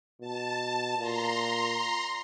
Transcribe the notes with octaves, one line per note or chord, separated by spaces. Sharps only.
B2 A5
A#2 A#5 C6